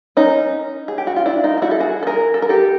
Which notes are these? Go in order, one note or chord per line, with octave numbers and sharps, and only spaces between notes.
C#4 D#4
G#4
G4
F#4
F4
D4 E4
D#4 F4
F4
E4 F#4
A4
F#4 G#4
A4
G#4 A#4
A4
A#4
G4 A4